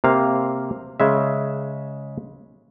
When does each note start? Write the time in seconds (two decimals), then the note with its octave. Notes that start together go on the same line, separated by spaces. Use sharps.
0.04 C3 A#3 F5
1.00 C#3 G#3 E5